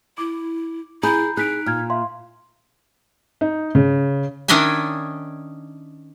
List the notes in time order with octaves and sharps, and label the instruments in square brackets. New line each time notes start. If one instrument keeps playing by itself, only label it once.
[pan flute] E4 [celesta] D6
[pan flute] E4 [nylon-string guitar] G#4 [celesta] A#5 B5 G6
[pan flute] D#4 [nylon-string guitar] G#4 [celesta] F#6 B6 D7
[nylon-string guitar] A#2 [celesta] F6 G#6
[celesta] E5 F5 C6
[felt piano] D#4
C#3
[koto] D#3 C#4 D4 D#5 E5 G#5